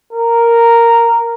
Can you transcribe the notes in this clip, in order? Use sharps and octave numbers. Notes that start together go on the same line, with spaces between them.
A#4